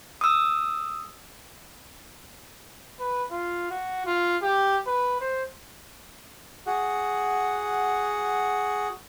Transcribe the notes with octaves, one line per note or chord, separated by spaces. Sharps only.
D#6 E6
B4
F4
F#4
F4
G4
B4
C5
F#4 G#4 F#5